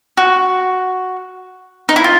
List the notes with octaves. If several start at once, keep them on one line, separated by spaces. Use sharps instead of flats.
F#4
D#4
E4
F4